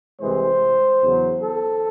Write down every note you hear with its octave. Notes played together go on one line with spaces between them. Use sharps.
C2 C3 E3 G#3 C5
E2 C#3 F#3
A4